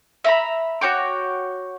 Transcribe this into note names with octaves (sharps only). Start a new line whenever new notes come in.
E5 A#5 B5
F#4 C#5 G5 D6